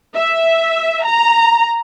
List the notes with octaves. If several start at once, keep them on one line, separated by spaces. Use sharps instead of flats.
E5
A#5